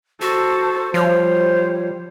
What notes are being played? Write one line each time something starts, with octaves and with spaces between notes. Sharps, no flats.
F#4 A4 C5
F3 G3 C5 C#5